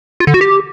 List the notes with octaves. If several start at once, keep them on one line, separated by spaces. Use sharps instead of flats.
F4
D3
F#4
G4